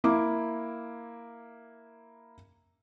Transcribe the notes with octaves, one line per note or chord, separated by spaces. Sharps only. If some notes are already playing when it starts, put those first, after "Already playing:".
A#3 E4 D6